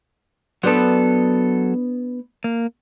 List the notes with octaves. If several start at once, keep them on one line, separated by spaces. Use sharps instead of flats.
F#3 B3 D4 A4 C5
A#3